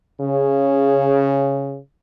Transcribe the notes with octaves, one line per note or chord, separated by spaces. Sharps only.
C#3